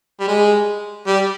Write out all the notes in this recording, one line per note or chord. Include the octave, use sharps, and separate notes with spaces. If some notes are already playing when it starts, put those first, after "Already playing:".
G3
G#3
G3